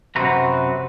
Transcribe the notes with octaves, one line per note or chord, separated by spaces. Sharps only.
F#2 C3 C4 F#4 B4 A#5